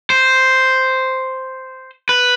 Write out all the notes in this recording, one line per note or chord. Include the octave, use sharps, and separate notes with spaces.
C5
B4